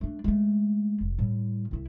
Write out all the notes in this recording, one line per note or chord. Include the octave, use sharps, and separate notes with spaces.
A3 D4
G#3 A3
F1
A2 G3
C2 E4